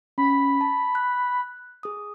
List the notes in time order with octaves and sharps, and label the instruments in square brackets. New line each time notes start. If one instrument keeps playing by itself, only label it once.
[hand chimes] C#4 [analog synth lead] B5
[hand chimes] A5
F#6
G#4 D#6